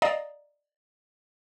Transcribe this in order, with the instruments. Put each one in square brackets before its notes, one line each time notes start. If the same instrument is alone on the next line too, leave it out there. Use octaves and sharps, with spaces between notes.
[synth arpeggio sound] D5 D#5 F5 A#5 D#6